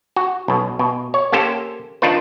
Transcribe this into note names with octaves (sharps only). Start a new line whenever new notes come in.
F#4
B1 B2
B2
C#5
A#3 C#4 G4 A4 C5
D#3 D4 D#4 F4 B4 C5